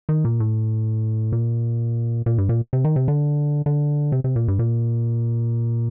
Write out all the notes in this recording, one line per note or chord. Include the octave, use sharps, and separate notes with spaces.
D#3
A#2
A2
A#2
A#2
G2
A#2
C3
D#3
C3
D3
D3
C3
C3
A#2
G2
A#2